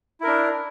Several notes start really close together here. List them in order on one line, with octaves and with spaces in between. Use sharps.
E4 A#4 D4